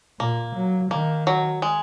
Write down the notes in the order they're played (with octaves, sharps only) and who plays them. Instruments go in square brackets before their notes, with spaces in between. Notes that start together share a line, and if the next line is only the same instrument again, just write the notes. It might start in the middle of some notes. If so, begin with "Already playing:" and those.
[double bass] A#2 [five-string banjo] A#3
[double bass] F#3
[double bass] D#3 [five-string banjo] A#3
[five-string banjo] F#3
G#3